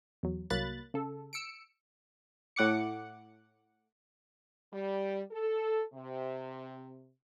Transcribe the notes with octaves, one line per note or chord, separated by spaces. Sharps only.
E2 F#3
C2 F#3 A#3 B5 F#6 A6
C#3 A4
E6 C#7 D7
A2 F#5 D6 C#7
G3
A4
C3